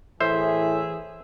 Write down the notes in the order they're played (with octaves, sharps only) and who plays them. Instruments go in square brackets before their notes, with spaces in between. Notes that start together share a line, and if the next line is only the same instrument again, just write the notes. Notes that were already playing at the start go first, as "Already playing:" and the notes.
[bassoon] A2 [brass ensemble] E3 G#4 [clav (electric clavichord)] C5 [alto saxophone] E5